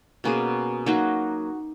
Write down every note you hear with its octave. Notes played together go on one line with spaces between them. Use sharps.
B2 A#3 C#4 G#4
F#3 A#3 D#4 F#4